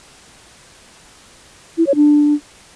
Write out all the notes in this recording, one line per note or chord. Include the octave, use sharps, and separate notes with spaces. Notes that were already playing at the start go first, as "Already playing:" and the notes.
E4
C#5
D4